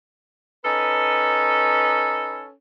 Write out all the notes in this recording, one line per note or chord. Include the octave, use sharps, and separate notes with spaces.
C#4 D#4 A4 B4